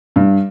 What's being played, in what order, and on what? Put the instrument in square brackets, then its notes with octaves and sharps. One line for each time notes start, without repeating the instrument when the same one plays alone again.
[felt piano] G2